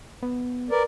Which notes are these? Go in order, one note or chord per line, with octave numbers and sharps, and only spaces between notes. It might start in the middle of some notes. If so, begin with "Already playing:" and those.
B3
A#4 B4 D5